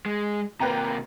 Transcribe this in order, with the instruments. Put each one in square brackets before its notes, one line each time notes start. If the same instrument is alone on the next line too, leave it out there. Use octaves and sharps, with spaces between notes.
[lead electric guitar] G#3
[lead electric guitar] C3 A#3 [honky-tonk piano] B4 G5 A#5